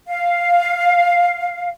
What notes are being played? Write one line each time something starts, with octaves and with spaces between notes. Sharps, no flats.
F5